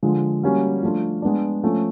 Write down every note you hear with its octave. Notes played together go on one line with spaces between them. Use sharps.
D3 F3 G#3
G3 A#3 C#4 F#4
F3 A3 D4 F4
G#3 B3 D4
F3 A3 C#4